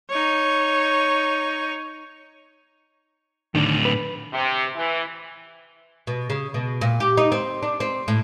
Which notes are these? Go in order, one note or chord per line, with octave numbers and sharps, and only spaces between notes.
D#4 C#5
A2 D3 D#3 D4
B4
C3
E3
B2
C#3
B2
A#2
G4
D#4
C4
D4
C4
A2